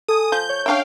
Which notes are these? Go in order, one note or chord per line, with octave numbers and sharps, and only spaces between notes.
A4 G#5 D#6
F3 G6
C#5
C#4 D4 E5 F5 G5